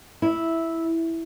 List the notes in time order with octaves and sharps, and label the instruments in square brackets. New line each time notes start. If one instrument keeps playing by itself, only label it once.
[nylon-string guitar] E4